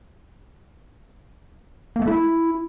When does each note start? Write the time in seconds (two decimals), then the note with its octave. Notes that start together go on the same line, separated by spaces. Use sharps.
1.96 A#3
2.02 A3
2.07 E4